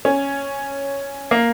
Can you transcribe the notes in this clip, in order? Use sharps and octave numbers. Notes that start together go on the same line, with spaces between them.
C#4
A#3